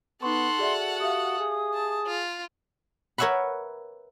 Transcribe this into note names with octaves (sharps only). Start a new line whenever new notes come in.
B3 D#4 A4 F#5 C6 C#6
F#4 G#4 D5 E5
G4 E5 F5 D#6
G#4
A5
F4
A#4 B4 C#5 E5 F#5 B5